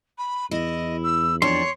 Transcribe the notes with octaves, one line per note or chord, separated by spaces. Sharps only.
B5
E2 E4 D#5
E6
F2 D4 C#5 C6